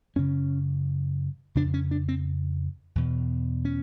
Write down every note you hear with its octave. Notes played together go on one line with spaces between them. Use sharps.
F#2 C#3 C#4
F2 C#3 D4
C#4
D4
C4
E2 B2
C#4